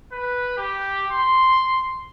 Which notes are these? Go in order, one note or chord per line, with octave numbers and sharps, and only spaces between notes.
B4
G4
C6